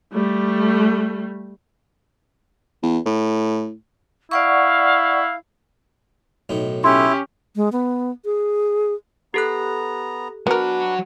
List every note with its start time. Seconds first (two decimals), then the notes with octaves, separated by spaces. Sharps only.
0.13 G3 A3
2.83 E2
3.06 A2
4.31 E4 D5 F5 F#5 C#6
6.49 B1 A2 D#4
6.84 C#4 E4 G4 C6
7.56 G#3
7.72 B3
8.25 G#4
9.34 B3 G4 A4 A#5 F#6
10.47 F#3 B3 D4 F#4 A#4 B4